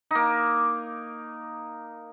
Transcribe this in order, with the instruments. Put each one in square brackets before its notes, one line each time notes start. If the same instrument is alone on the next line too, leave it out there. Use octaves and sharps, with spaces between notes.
[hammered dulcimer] A#3 D#4